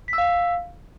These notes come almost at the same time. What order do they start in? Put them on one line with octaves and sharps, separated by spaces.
B6 E6 F5